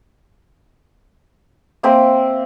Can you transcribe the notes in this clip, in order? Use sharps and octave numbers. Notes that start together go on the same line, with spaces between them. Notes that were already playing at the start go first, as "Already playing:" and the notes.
A#3 C4 E5